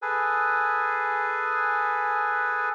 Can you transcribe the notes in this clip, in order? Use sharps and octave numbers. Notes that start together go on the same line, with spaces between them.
G#4 A4 B4 G#5